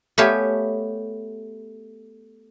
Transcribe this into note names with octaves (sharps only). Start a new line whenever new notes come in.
A3 B3 G4 C#5 F5 G#5